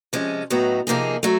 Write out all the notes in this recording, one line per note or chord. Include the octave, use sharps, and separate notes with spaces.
C3 F3 G#3 C#4
A2 F#3 B3 D#4
C3 F3 A#3 D#4 G#4
F#3 A3